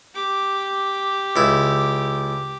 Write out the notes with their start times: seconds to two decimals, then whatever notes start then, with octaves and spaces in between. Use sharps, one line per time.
0.15 G4 D6
1.36 C#2 E4